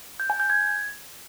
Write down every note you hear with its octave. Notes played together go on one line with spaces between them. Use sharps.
G6
G#5
G6
G#6